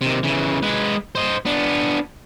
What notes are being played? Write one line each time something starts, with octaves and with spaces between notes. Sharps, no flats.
C3 D#3
C#3 E3
G#3 B4
C5 D#5
B3 D4